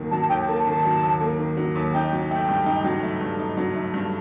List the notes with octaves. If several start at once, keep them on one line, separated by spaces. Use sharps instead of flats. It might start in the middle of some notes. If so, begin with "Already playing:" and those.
Already playing: D#2 D#3 F#3 A#3
F#3 A5
D#2 G5
A#3 A5
D#3 A5
F#3
D#2
A#3
D#3
F#3
D#2
D#4 G5
F#3
A3 G5
G2
D#4
F#3
A3
G2
D#4
F#3
A3
G2